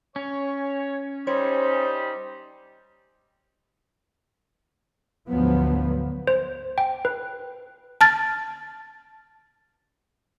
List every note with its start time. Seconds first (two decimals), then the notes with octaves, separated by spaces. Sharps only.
0.16 C#4 C#5
1.27 G3 D#4 G4 C5 C#5
5.29 D2 G#2 D3 F3 F#3 B3
6.27 C5
6.78 G5
7.05 B4
8.01 A5 F6 A6